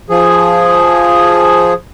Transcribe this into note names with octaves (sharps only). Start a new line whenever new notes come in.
F3 G#4